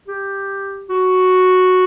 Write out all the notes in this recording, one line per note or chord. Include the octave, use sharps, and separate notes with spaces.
G4
F#4